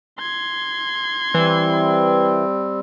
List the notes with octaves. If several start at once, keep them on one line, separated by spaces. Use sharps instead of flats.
C6 G#6
E3 G3 C4